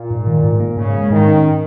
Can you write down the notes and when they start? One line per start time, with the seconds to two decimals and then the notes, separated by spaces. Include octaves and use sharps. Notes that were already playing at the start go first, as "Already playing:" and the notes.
Already playing: A#2
0.10 G#2
0.27 D#3
0.43 G#2
0.60 A#3
0.76 G#2 C#3
0.94 G#3
1.10 G#2 D#3
1.27 C#4